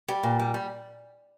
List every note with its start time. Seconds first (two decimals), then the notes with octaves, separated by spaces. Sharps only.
0.08 G3
0.23 A#2
0.39 G3
0.54 G3